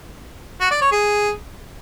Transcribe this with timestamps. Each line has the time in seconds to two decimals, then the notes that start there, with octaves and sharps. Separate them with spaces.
0.61 F#4
0.71 D5
0.81 C#5
0.91 G#4